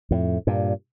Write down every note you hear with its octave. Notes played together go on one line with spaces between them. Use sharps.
F2 A2
G2 A#2